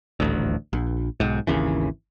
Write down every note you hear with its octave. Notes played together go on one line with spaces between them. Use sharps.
D#1 A1 D2
A#1
B1 G#2
G#1 D#2 C#3 E3